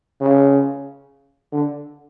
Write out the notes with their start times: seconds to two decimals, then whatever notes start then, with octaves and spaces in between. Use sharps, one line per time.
0.21 C#3
1.53 D3